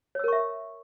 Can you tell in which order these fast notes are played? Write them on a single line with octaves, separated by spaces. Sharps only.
C#5 E6 A#4 C#6 E5